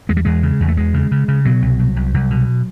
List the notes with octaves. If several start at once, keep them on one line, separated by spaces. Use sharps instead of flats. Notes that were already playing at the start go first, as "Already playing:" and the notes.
E2 G#3
G3
E2 G#3
C#3
E2
A3
E2 G#3
C#3
C#3
C#3
B2 F#3
C2
C2
C2
C2
B2